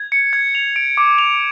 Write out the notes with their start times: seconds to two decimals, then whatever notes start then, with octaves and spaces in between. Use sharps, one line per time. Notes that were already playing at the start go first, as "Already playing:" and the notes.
Already playing: G#6
0.12 C#7
0.33 G#6
0.55 F7
0.76 D7
0.97 D6
1.18 F7